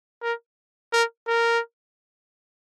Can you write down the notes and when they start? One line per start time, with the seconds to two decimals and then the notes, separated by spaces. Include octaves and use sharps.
0.22 A#4
0.93 A#4
1.28 A#4